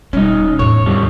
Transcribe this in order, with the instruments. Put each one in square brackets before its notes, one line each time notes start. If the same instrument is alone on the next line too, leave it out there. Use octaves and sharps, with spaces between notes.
[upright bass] E1 G3 [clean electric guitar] C#4 D#4
[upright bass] E2 A2 [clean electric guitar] C#5
[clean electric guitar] D3 G3 C4